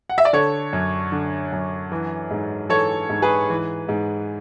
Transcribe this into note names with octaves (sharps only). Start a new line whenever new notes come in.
F#5
E5
D5
D3 A4 C#5
F#2
D3
F#2
E3
G#2
E3 A4 C#5
G#2
G#4 B4
E3
G#2